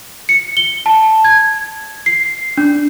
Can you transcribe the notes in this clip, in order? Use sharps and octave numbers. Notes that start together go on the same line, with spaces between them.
C#7
G7
A5
G#6
C7
D4